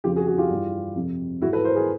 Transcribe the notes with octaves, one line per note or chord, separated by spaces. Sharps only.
F2 C#3 F3 F4 G4
F#4 G#4
F#4 G#4
F4 G4
G2 E3
F2 C3 F3
G#2 E3 E4 F#4
A4 B4
A#4 C5
G#4 A#4